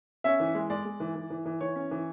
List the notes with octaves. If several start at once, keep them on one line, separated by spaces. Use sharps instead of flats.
C#4 E5
E3
G#3
G#3 D5
G#3
E3
E3
E3
E3
E3 C#5
C#4
E3